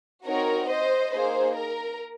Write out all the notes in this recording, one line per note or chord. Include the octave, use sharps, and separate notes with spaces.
C4 D#4 F#4 A#4 C#5
C5 D#5
A#3 D#4 G#4 C5
A#4